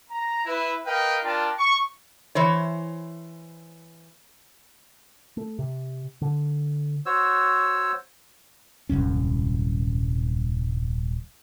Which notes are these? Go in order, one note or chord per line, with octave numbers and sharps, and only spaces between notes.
A#5
E4 B4
A#4 B4 D#5 F5 G5
D4 F4 A#4 D5 G5 A5
C#6
E3 C5 C#5
A3
C3
D3
F#4 C5 C#5 E6
D#1 C2 F#2 C#4